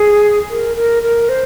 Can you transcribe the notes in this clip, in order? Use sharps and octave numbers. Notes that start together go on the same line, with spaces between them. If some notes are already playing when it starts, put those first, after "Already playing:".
Already playing: G#4
A#4
A#4
A#4
C5